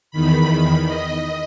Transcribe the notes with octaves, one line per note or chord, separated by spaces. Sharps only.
E2 D#3 B5
D#5